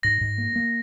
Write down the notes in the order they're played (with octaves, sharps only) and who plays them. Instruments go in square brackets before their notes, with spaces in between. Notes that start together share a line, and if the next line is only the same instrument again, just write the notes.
[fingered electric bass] G#2 [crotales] A#6
[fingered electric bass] G#2
A#3
A#3